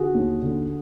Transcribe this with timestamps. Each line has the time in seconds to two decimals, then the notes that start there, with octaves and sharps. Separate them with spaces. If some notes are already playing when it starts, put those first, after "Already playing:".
Already playing: D3 F#4 G#4
0.14 D#2
0.42 D3